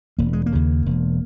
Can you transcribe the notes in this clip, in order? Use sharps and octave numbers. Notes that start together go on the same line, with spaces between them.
E1 A#3
G#3
A#3
D#2 C#3
E1